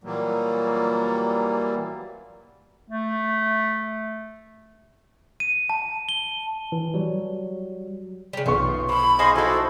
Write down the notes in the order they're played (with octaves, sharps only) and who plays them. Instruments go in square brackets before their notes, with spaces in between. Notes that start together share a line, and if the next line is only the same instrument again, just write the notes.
[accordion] A#2 E3 F#3 G3 A#3
[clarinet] A3
[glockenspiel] D#7
A5
G7
[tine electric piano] E3
F#3 G3
[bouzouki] C#3 G3
[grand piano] B1 B3 C#6 [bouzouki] A2 F4
[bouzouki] F3 A4 [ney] B5
[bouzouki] D#4 C5 G#5 [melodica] G#4 D#5 F5
[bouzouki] F3 C4 [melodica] E4 A4 [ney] F#4